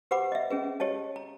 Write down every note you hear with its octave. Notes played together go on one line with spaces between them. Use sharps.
G4 B4 C5 F#5 B5 D6
D#5 E5
C#4 G#4 B4
G4 C#5 D#5 A5
A#5